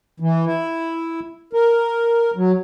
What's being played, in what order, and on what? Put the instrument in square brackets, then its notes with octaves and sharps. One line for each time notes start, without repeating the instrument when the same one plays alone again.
[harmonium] E3
E4
A#4
F#3